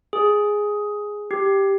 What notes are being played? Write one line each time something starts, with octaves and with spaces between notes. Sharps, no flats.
G#4
G4